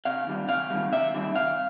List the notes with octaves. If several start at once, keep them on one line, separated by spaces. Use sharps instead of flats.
C3 F5
D#3 G3
C3 F5
D#3 G3
C3 E5
D#3 G3
C3 F5